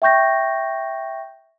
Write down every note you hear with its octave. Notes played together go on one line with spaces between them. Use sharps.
E5 G5 C#6 G6 A#6